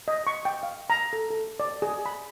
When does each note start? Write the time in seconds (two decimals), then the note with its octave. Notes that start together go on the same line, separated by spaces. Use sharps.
0.08 D#5
0.27 C#6
0.45 G5
0.63 F5
0.90 A#5
1.13 A4
1.30 A4
1.60 D5
1.82 G#4
2.06 B5